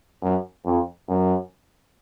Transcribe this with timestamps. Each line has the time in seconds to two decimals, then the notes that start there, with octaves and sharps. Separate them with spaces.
0.22 F#2
0.65 F2
1.09 F#2